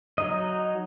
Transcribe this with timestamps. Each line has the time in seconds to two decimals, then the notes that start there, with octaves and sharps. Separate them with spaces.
0.18 F#3 D#4 D#5